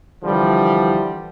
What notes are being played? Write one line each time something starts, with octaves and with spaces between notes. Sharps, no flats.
D3 E3 F3 G3